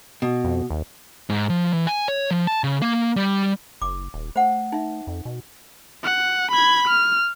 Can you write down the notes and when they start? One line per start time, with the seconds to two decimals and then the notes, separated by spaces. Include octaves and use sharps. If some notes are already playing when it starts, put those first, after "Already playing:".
0.22 B2
0.44 F2
0.70 D#2
1.30 G#2
1.50 F3
1.73 E3
1.87 G#5
2.08 C#5
2.31 F3
2.47 A5
2.64 C#3
2.82 A#3
3.16 G3
3.82 F#1 D6
4.14 D#1
4.36 A3 C5 F#5
4.72 D#4 E5
5.07 F2
5.25 B2
6.04 F#5
6.51 B5 G#6
6.87 F6